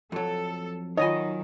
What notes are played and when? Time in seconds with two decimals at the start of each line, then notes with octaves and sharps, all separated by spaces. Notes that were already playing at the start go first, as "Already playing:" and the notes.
0.12 F2 F#3 A4
0.98 D#3 F#3 D#4 F4 C#5 D#5 F#5 G#5